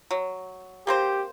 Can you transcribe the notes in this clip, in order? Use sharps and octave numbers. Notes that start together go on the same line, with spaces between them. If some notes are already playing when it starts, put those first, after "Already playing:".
F#3
A#3 C4 G4 C5